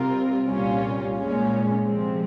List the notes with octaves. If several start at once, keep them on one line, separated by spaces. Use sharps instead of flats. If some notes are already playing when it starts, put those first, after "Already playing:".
Already playing: C3 G3 C4 F4 A#4
C2 A#2 G3 C#4 F4
A#2 G#3 C#4
C3 F3 G#3 C4